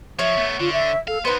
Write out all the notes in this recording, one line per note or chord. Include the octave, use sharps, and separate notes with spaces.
F3 C#5 E5
A3 B3
D3 F4
E5
A4 F5
B3 D#4 B4 C5 B5